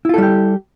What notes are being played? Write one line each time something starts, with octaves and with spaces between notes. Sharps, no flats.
G3 E4 F4 G4 A4